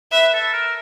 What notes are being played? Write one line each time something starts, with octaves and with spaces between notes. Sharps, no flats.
B4 E5
A4
A#4